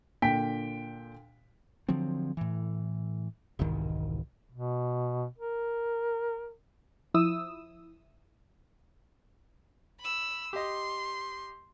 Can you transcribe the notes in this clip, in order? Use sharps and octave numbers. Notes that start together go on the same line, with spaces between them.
A#2 D3 G5 B6
D3 F3 F#3 C4
A2 E3
E1 C2 G#2 D#3
B2
A#4
F3 E4 D#6 E6
B5 E6
G4 D#5 C6